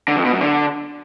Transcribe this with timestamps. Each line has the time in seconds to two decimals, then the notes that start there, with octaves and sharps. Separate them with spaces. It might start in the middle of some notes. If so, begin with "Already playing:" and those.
0.08 D3
0.16 F2
0.24 B2
0.33 F#2
0.41 D3